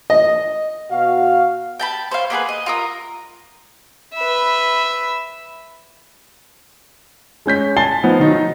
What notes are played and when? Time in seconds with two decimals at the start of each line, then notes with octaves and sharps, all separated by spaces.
0.10 D#5
0.91 B2 F#4 F5
1.79 G5 A5 B5
2.11 C5 C#5 F5
2.30 A#3 B3 G#4 B4
2.49 D#5
2.66 F4 A#4 D#6
4.14 B4 E5
7.46 G#3 C#4 G6 B6
7.77 G#5 A5 A6 C7 G7
8.03 F3 B3 D#4
8.20 D#3 F#3 D#4
8.33 D#4